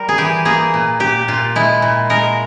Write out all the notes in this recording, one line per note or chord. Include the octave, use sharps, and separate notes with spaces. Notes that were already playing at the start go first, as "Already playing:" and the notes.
Already playing: G3 A#4
G#4
E3 G4
A#3 G#4
A#2
A#2 G4
A#2 F4
G#3 E4
A#2
G#3 A#4